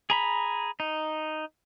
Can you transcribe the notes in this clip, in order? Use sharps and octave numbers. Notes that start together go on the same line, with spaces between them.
G#4 A#5 B5
D#4